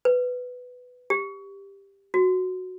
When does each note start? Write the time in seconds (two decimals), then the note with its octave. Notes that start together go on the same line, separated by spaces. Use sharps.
0.05 B4
1.10 G4
2.14 F#4